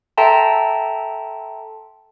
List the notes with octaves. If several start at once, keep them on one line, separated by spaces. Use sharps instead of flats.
A4 E5 G5 A5 A#5 C6